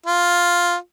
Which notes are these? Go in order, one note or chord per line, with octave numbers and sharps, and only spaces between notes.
F4